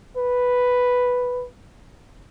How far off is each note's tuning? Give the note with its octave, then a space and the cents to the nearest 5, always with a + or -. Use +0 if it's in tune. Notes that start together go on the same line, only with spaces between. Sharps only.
B4 +0